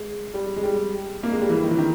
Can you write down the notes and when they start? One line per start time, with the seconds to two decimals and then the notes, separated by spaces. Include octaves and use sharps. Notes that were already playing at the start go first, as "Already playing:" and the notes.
Already playing: G#3
0.34 G3
0.56 G#3
0.63 G3
1.23 A#3
1.32 G#3
1.41 G3
1.49 E3
1.64 D#3
1.71 E3
1.78 D#3